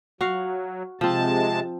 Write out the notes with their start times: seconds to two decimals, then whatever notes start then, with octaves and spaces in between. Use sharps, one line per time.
0.21 F#3 F#4 F5
1.01 C3 F3 G#3 C4 A5